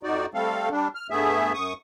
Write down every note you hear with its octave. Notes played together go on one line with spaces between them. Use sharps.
F2 D#4 F#4 D5
G3 A3 C4 A4 F5
G3 D4
F6
G2 A3 B3 G#4 E5
F#2 C#6 D#6